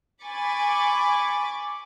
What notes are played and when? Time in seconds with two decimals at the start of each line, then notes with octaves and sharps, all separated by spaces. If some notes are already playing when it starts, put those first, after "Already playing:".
0.24 G#5 B5 C#6 D6 A6